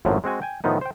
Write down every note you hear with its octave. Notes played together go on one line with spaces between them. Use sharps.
G#1 F#2 A2 F3 F#3
G#3 C4 F#4 G#5
G5 G#5
A2 D#3 F3 B3 D#4
C5 G5